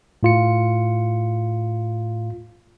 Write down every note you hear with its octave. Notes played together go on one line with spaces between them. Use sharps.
A2 F4 C#7